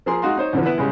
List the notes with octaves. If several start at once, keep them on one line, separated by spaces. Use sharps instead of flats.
F3 G#4 A#4 C6
G#3 D#4 F#4 F5 C6
D#4 C5 C#5
E2 D3 E3 F3
B3 E4 B4
C#3 G3 G#3